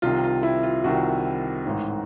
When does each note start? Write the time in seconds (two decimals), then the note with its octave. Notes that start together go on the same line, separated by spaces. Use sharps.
0.02 C2 C3 D#3 F4
0.24 F4
0.43 E4
0.63 F4
0.84 C2 C3 D#3 F#4
1.65 A1 G#2 D#3